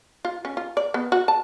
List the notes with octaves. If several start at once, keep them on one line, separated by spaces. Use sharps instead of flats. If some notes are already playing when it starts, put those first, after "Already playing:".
F4
C#4
F4
D5
B3
F#4
A5